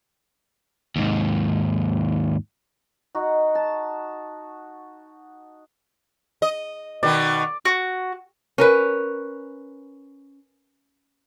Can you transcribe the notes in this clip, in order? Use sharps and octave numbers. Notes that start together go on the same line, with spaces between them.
D#2 G#2
D#4 F#4
A5
D#5
B2 D#3 D5
F#4
C#4 A#4 B4